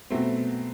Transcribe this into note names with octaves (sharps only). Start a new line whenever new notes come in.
B2 F#3 A3 C4